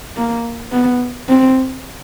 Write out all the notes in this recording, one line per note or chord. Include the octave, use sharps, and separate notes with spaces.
A#3
B3
C4